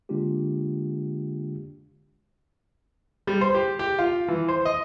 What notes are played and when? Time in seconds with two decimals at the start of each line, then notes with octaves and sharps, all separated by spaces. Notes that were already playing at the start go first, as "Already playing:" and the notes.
0.09 D3 G#3 A#3 D4 F4 G4
3.27 G3
3.41 C5
3.55 G4
3.79 G4
3.99 F4
4.28 E3
4.48 C5
4.65 D#5